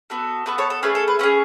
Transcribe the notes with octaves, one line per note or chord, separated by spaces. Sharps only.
B3 F#4 A4
B3 F#4 A4 B4
A4 C#5
A4
A3 C#4 G#4 B4
A4
B4
A3 C#4 G#4 B4